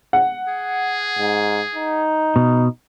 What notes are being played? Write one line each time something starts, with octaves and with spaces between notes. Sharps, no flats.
F#5
G#4
G#2
D#4
B2